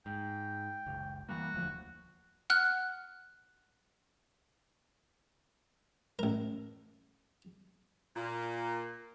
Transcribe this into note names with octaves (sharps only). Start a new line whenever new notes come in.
G#2 G5
F#1 C#2
E3 G3 A#3 F#4
E1 D2 F3
F#5 F6 F#6
A1 A#4
A#2